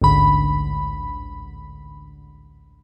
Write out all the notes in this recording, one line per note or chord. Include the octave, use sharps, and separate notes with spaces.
A1 D2 G#2 D3 B5